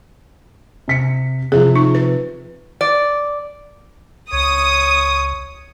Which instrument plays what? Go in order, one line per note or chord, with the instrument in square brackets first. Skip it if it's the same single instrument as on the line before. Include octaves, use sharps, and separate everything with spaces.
[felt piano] C3 B6 C#7
[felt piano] C3 F3 [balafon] G#4
[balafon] D#4
B4
[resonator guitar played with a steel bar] D5
[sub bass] C#2 [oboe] C#5 [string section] D#6